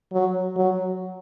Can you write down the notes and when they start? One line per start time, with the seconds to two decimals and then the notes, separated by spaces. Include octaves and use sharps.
0.13 F#3
0.56 F#3